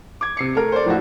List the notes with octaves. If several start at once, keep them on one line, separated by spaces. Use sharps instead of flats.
D6 G#6
C3 C7 C#7
A3 A#4
C5 D5
A2 F3 E4 F#4